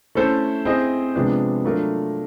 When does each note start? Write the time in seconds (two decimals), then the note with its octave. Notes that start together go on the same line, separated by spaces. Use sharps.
0.15 A3 C#4 E4 A4 C5
0.65 C4 E4 G#4 C5 D#5
1.15 C3 F3 G#3 B3 D4
1.64 F#3 A3 D4 F4 A#4